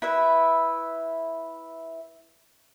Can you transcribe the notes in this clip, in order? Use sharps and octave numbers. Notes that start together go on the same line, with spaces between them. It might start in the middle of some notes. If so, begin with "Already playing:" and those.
E4 B4 E5